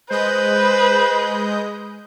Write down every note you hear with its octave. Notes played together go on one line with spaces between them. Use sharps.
G#3 B4 C5 D#5 G6